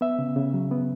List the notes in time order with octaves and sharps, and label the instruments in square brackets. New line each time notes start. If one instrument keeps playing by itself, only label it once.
[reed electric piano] B3 E5
C#3
C#3
F#3
B3